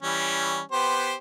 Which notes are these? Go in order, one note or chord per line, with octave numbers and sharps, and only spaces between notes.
E3 G3 C#4
B3 G4 C5